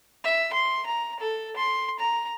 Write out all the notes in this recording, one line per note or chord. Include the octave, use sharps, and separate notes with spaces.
E5
C6
A#5
A4
C6
A#5